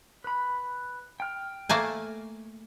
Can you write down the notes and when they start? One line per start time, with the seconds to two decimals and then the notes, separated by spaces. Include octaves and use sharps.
0.24 B4 B5
1.20 G5 F6
1.69 A3 A#3 G#5